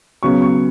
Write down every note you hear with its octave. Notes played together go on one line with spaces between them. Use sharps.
C#3 F#3 B3 C#6
C#6